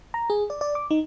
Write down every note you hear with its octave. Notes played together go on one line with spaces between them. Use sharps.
A#5
G#4
D5
D5
D6
D#4